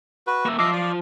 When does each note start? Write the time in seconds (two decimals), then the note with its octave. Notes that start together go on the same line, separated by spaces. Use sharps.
0.27 F#4 B4
0.46 A#3 E5
0.59 F3 D#5 E5 D6 C7
0.73 D5